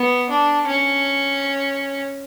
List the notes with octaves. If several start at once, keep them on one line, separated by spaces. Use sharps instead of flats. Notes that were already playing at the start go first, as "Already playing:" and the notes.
Already playing: B3
D4
C#4